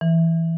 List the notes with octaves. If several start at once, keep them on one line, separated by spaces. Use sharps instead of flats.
E3